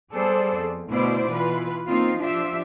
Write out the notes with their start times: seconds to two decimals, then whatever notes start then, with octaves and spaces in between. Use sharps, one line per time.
0.11 G3 B3 G#4 A4 C5 D5
0.57 F2
0.91 D2 B2 E4 C5 D5
1.29 B2 E3 F4 B4
1.86 A#3 C4 D#4 F4
2.19 F3 D4 F4 G4 E5